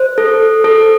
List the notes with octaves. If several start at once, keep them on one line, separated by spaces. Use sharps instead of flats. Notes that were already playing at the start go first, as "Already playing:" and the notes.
Already playing: C5
A4
A4